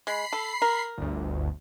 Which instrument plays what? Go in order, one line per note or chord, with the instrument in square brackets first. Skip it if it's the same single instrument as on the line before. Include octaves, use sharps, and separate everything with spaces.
[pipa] G#3 [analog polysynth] B5 C7
[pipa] A4
A#4
[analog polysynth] G1 D2